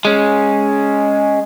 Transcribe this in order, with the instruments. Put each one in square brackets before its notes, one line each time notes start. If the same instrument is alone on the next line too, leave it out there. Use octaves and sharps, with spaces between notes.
[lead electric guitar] G#3 C#4